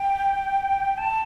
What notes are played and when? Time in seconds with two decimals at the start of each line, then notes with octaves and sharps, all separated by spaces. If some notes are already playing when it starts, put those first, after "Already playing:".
Already playing: G5
0.97 A5